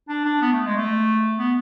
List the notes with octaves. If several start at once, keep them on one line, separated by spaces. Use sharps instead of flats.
D4
D4
B3
A3
G#3
A3
B3